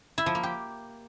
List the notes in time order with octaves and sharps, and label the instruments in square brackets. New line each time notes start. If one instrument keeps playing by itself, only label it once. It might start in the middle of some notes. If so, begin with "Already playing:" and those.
[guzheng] E4
F3
A#3
G4